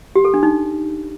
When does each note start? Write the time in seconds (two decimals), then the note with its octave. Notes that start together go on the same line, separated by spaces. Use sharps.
0.16 G4
0.25 A4
0.34 D4
0.43 D#4